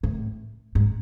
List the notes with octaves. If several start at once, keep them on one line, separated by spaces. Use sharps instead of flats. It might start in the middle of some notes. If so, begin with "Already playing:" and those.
A2
G#2